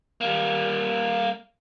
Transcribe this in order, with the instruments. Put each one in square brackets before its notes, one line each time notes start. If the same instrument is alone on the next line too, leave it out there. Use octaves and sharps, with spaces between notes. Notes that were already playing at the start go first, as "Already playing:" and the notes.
[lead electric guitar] G3 A#3